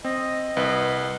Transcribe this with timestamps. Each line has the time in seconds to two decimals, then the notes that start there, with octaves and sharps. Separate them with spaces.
0.04 C4 D#5
0.57 C2 B4